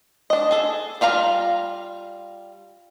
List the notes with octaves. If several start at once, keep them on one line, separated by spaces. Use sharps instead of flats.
D4 D#5
G#4 A4
G3 F4 F5 A#5